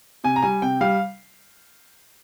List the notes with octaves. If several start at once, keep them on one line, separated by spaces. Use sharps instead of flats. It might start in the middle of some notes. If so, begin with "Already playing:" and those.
C3 G#5
A#5
G3 G#5
C3 G5
G3 F5